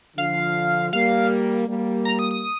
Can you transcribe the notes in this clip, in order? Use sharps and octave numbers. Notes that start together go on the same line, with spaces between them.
D3 F3 F5
G3 A#3 F5
G3 A#3
A#5
D#6
D#6